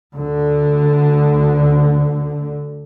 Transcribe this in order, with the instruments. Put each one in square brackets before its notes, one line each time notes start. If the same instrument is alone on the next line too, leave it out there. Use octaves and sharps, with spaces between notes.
[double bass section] D2 D3